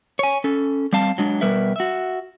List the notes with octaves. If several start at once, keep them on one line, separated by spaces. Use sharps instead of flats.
C#5 G#5
C#4 A4
G3 C4 F5 A5
F#3 G#3 D4
B2 G3 A#4 B4 E5
F#4 E5